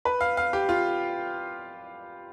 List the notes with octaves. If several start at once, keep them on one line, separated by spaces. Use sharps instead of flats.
B4
F5
F5
G4
F4